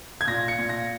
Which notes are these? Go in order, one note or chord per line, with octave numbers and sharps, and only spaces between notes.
G#6
A#2 A#6
C#7
A#2
A#6